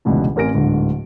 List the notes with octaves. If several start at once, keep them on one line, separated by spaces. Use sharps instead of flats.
F1 C#2 B2 E3 D4
A1 C4 A#4 G#5 A#6 D7
D1 G#2 D3